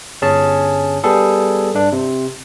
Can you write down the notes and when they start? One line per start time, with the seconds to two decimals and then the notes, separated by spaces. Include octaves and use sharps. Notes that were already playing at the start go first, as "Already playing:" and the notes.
0.22 G1 C#4 G#4 A5
1.04 G3 B3 G#4 A4
1.75 G2 D4
1.92 C3